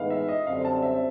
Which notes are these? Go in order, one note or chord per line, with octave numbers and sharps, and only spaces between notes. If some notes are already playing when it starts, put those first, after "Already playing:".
Already playing: A2 E3 G#3 B3 D#4 F5
E5
D#5
F#2 D3 G3 C4 F5
A5
E5